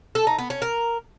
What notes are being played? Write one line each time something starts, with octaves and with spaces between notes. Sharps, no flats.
A4
D#4
B3
C#4
A#4